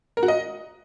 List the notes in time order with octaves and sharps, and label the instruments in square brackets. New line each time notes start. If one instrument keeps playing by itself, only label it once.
[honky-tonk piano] A#4
F#4
D#5